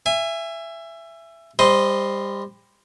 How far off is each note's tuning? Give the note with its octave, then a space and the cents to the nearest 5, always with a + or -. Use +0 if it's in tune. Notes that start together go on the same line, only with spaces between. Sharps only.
E5 +20 G#5 -20
G3 +25 C5 +0 D#5 +0